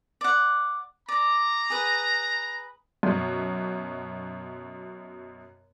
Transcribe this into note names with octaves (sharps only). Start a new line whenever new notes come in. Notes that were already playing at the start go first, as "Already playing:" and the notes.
D5 F#5
D5 A#5
G#4 B4
F#2 B2